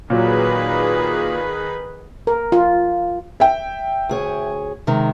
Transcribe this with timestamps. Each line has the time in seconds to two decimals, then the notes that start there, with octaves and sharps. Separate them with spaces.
0.10 A#2 D#3 F#3 G#4 B4
2.27 A#4
2.52 F4
3.40 E5 G5
4.09 D2 G#4 C#5
4.87 C3 D#3 G#3